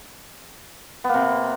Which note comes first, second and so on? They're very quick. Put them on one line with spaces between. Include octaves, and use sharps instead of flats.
B3 A#3 C3